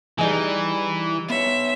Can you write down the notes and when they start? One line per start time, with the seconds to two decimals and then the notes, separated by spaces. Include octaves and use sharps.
0.18 E3 G3 D#4 G#4
1.30 B3 C#5 E5